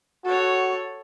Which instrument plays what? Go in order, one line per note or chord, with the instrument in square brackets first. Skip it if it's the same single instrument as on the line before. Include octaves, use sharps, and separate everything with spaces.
[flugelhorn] F#4 [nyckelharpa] A4 C#5